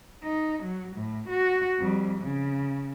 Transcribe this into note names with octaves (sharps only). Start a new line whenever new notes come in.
D#4
F#3
A2
F#4
F2 G3
C#3